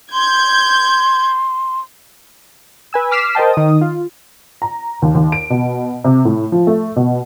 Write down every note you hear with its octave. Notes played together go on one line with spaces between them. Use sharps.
C6 G6 G#6
B4 G#5 E6
D6 F6 B6 C7 E7
A#4 C5 D#5 G5 A5
D#3 D#6
F4
A#5
D#2
D#2
D7
B2
C3
A2
F3
A3
B2